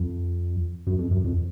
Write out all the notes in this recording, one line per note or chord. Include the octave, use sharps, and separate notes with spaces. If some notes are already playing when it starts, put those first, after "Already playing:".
Already playing: F2
F#2
F2
F#2
F2